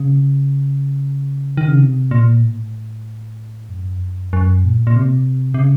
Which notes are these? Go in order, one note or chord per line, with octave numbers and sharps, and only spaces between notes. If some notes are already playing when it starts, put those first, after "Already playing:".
Already playing: C#3
D#3
C#3
C3
A#2
A2
F#2
F2
F#2
F#2
A#2
A#2
C3
C3
C#3